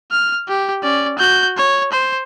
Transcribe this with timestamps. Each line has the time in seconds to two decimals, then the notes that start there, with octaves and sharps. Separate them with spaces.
0.11 F6
0.48 G4
0.83 C#4 D5
1.18 F#4 G6
1.57 C#5
1.92 C5